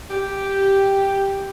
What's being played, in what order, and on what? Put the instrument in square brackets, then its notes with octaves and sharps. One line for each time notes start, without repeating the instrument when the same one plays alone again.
[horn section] G4